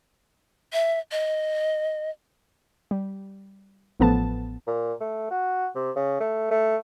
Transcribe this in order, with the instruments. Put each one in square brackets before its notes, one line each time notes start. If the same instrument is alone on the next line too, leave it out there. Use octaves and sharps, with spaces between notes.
[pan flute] E5
D#5
[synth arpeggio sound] G3
A1 A2 F3 B3 A4 A5
[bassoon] A#2
A3
F#4
C3
C#3
A3
A3